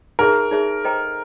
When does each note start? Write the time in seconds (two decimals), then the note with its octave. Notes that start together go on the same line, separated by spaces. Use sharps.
0.19 D#4 G#4 A#4 C#5 E5
0.51 D#4 G#4 C#5 E5
0.84 A4 C5 D#5 G5 A#5